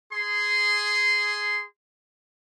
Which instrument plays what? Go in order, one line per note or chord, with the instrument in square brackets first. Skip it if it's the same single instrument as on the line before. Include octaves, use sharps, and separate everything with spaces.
[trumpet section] G#4 C6